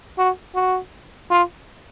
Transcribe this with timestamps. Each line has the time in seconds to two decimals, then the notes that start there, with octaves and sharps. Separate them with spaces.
0.18 F#4
0.55 F#4
1.30 F4